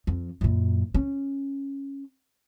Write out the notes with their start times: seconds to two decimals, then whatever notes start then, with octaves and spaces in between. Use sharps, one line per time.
0.07 F2
0.41 F#2 A#2
0.94 C#4